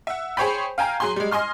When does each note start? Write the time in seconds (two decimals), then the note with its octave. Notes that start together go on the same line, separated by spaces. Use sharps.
0.07 E5 F#5
0.37 G#4 C5 C#5 G5 B5
0.78 F5 G5 G#5 A#5
1.00 F#3 G#4 C6
1.16 G3 G#3
1.31 D#5 G#5 C6 F6